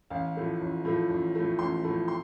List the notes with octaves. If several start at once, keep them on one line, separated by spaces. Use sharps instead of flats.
A1 F5
A2 F3 A3
A1
A2 F3 A3
A1
A2 F3 A3
A1 C6
A2 F3 A3
C6